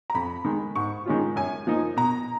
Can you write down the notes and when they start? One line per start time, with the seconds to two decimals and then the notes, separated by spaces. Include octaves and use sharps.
0.10 A#5
0.14 F2 B5
0.45 D#3 G#3
0.75 G#2 C#6
1.06 D#3 G#3 C#4 F4
1.36 F#2 G#5
1.67 F3 A#3 D#4
1.96 B2 A#5